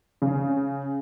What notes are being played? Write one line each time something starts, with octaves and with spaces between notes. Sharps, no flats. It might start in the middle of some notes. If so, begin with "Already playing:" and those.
C#3